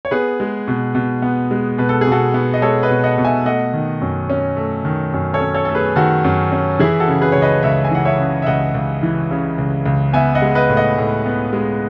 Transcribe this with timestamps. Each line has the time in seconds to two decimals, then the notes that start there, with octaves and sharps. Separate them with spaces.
0.05 C#5
0.11 B3 G#4 B4
0.40 G#3
0.68 B2
0.95 B2
1.22 B3
1.51 G#3
1.78 B2 B4
1.89 A4
2.01 G#4
2.07 B2 F#4 A4
2.34 B3
2.54 D#5
2.62 G#3 A4 C#5
2.83 B4 D#5
2.90 B2
3.04 D#5 F#5
3.18 B2
3.25 E5 G#5
3.45 A3 D#5 F#5
3.74 D#3
4.02 F#2
4.30 C#4
4.57 A3
4.85 D#3
5.13 F#2
5.34 A4 C#5
5.41 C#4
5.54 A4 C#5
5.65 A3 A4
5.75 G#4 B4
5.96 D#3 F#4 A4
6.24 F#2
6.52 C#4
6.79 E3 E4 G#4
7.00 F#4 A4
7.08 C#3
7.22 G#4 B4
7.32 C#2 C#5
7.42 B4 D#5
7.63 C#2 C#5 E5
7.85 G#5
7.91 E3 F#5
8.05 C#5 E5
8.19 C#3
8.42 E5
8.47 C#2 D#5 F#5
8.75 C#2
9.03 E3
9.31 C#3
9.58 C#2
9.86 C#2
10.13 B3 E5 G#5
10.35 D#5 F#5
10.42 G#3
10.55 B4 D#5
10.70 A2
10.77 D#5 F#5
10.98 A2
11.26 B3
11.53 G#3